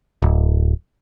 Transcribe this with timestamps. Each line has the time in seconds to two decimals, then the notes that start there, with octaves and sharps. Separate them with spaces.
0.22 D1